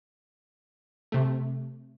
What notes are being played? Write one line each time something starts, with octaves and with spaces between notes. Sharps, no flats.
C3 A3